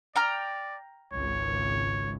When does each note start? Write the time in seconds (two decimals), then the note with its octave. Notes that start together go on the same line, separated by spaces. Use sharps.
0.16 D5 G5 A#5 F6
1.13 G#1 C#2 C#5